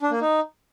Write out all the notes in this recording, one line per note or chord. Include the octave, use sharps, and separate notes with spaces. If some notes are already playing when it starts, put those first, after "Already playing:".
D4
A#3
D#4